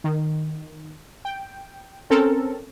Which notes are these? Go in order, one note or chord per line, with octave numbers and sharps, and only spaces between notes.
D#3
G5
C4 C#4 A4 A#4